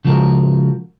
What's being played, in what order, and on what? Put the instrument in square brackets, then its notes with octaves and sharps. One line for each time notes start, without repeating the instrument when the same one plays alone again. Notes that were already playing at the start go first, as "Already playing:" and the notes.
[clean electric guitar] C#3 F3 G#3 F#4 A#4